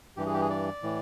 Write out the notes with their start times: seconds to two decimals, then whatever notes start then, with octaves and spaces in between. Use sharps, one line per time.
0.17 G2 E3 G4
0.26 G#4
0.34 G4
0.41 G#4
0.50 D5
0.83 A2 E3